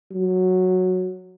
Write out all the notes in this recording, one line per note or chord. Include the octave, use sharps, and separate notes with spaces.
F#3